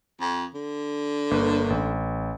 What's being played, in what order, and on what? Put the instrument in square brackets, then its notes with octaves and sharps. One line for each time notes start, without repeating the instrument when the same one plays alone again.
[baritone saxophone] F2
D3
[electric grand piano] G1 A#3 B4
A1